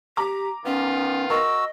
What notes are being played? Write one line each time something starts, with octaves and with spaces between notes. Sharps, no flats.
G4 A#5 D6
D#3 B3 C#4 F4
F#4 A#4 D#5 E6